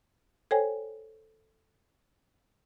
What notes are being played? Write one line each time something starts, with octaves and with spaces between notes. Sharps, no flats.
A4 C5 C#5 G5 G#5